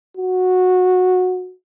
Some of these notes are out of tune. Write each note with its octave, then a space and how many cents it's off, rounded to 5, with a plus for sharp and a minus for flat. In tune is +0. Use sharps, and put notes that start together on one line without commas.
F#4 -15